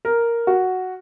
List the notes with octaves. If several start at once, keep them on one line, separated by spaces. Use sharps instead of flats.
A#4
F#4